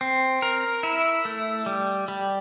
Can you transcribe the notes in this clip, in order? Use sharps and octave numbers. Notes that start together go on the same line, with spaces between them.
C4
A#4
E4
A3
G3
G3